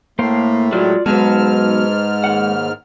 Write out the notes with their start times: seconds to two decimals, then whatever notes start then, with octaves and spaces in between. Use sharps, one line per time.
0.19 A2 A3 A#3 C5 F5
0.72 F#3 G#3 F4 D5 F6
1.06 G#2 B2 F#3 G#3 B4 A5 F6
2.24 D#2 F#5